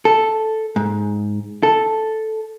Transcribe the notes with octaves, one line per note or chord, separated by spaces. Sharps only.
A4
G#2
A4